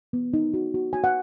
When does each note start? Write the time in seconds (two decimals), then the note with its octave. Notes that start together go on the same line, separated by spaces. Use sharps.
0.13 B3
0.34 D#4
0.54 F#4
0.74 F#4
0.93 F#4 G#5
1.04 F#5